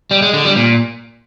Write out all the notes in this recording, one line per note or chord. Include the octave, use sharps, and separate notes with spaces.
G3
G#3
D3
G3
A#2